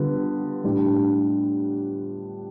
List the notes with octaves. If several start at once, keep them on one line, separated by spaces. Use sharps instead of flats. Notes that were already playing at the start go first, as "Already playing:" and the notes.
Already playing: D3 G3 B3 F4
A2 G3 D4